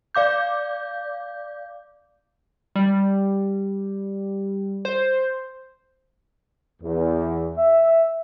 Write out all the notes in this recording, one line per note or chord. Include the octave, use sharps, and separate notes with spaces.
D5 F5 D6 G6
G3
C5
E2
E5